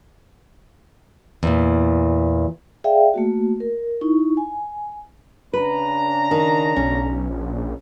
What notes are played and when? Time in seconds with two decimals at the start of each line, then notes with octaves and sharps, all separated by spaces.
1.43 E2 A#2
2.84 G#4 D5 E5 F5 G5
3.14 A3 A#3 F#4
3.60 A#4
4.01 D#4 E4 C#6
4.37 G#5
5.53 C#3 D4 B4 A#5
6.31 D#3
6.76 B1 C#4
7.29 A#1